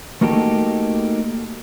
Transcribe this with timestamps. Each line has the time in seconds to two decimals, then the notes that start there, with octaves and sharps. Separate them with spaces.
0.21 A3 A#3 D#4 F#4 G4 A4